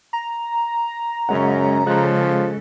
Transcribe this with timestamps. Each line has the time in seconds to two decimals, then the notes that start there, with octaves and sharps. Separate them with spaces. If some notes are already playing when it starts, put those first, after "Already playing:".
0.13 A#5
1.29 F#2 C#3 G#3 C#4 F#5
1.86 C#3 F3 G#3 A4 F#6